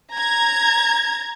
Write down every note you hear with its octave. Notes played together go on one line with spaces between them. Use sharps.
A#5 G#6